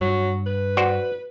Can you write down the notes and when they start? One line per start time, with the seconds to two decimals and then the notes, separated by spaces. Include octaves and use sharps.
0.01 G2 F#3
0.46 B4
0.77 F#4 C5 D5